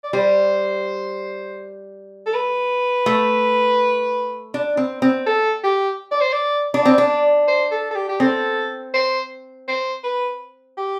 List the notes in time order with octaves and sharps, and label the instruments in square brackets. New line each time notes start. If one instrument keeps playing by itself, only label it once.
[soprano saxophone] D5
[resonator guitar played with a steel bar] G3 [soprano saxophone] C5
[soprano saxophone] A4
B4
[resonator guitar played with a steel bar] A3
D4
C4
C4
[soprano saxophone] A4
G4
D5
C5
D5
[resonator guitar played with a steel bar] D4 [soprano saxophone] D5
[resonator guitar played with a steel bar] C4
D4
[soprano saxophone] C5
A4
A4
G4
G4
[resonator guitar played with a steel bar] C4 [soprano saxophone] A4
[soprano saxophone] C5
C5
B4
G4